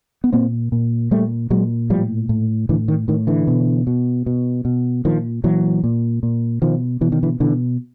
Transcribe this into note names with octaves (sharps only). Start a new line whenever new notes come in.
B3
A#2 A#3 C4
A#2
A#2 G3 A3
A#2 F#3 G#3
A2 F3 G3
A2
A2 D3 E3
D#3
A2 D#3
D3 E3
B2
B2
B2
B2
A#2 D#3 F3
A#2 E3 F#3
A#2
A#2
B2 D#3 F3
B2 E3
D#3
D3 E3
B2 D3 E3